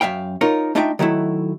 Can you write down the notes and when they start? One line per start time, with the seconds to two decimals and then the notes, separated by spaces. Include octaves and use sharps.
0.01 F#2 E5 F5 G5
0.41 D#4 F4 A#4 C#5
0.75 A3 D4 D#4 F4 E5 G5
0.99 D#3 F#3 A3 E4